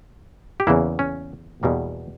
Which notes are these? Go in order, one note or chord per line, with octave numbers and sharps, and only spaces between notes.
G4
E2 C#3 E3 A#3 E4
C#4
E2 B2 G3 A#3